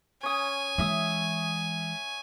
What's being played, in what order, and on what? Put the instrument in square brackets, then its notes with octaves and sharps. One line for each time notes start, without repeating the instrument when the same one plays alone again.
[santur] C#4 D#6 [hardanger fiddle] G#5
[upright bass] E3 G#3 [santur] E5 D#6